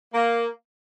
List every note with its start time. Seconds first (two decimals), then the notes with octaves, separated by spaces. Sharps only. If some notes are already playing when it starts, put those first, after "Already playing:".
0.13 A#3